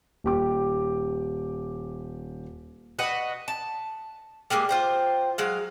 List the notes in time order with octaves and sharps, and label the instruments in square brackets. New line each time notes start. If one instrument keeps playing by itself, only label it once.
[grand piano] D#1 G4 D6
[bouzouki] F#4 B4 D#5 F#5
A5
G3 G#3 A#3 G#4
F4 C5 G5
F#3 G#3 F5